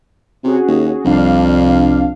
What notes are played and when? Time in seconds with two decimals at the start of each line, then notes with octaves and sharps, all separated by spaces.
0.44 C3 C#4 F#4 G#4
0.68 D#2
1.05 C2 F2 D4 F5